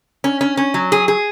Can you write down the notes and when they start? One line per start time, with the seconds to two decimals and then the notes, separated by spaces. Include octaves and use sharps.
0.24 C#4
0.41 C#4
0.57 C#4
0.74 F#3
0.92 G#4
1.08 G#4